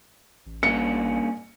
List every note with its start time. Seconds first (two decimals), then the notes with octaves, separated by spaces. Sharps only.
0.46 A1
0.63 G2 A#3 C#4 C#7